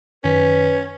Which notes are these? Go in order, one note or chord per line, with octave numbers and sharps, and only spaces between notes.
F#2 D#3 C#4 B4 B6